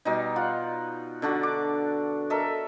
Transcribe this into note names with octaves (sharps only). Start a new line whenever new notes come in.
B2 G3 D#4
F4 F#5
D3 D4 F#4
D6
A4 A#4 D#5 E5